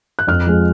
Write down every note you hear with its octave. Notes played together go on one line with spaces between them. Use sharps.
F#6
F2 F6
F3 G#3